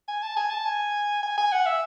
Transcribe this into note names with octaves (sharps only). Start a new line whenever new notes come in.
G#5
A5
G#5
A5
G#5
G#5
G#5
F#5
E5